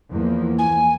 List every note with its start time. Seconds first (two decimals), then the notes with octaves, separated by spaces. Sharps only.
0.11 E2 F3 A#3
0.59 G#5